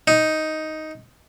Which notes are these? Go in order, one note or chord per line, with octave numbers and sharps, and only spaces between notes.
D#4